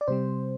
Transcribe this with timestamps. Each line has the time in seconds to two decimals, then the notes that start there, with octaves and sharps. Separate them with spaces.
0.01 D5
0.08 C3 G3 C4 C5